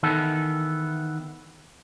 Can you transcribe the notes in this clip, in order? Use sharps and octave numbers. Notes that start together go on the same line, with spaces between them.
D#3 E3 B3 A4